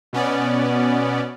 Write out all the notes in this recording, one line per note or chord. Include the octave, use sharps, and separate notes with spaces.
B2 B3 C#4 D5